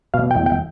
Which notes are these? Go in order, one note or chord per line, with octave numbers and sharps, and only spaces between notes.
B2 F5
G5
E2
G5